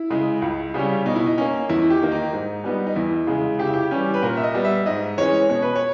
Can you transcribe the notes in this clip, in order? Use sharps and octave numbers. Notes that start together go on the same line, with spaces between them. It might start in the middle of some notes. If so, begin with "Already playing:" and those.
Already playing: E4
C#3 G#3
C#2
C#3 G3 C#4
B2 D#4
E4
D#4
A#3 C#4
E2 E4
G4
D#3 A#3 D#4
D#4
G#2
G3 B3 D#4
D#4
E2 E4
C#3 G#3
C#3 G4
E4
G4
E3 G3 C#4
B4
A#2 A#4
E5
D#5
G3 B3
E5
G#2 D#5
E3 G#3 C#4 C#5
B2 C#5
B4
C#5